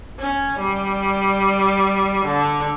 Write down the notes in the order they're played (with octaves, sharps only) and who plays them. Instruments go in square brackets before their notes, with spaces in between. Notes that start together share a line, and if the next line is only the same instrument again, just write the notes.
[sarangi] C#4
G3
D3